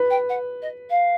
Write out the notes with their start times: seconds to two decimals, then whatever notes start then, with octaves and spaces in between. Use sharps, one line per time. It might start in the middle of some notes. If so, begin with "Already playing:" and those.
Already playing: B4
0.10 G5
0.29 F#5
0.62 D#5
0.90 F5